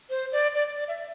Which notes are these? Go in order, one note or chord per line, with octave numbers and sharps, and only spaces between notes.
C5
D5
D5
D5
E5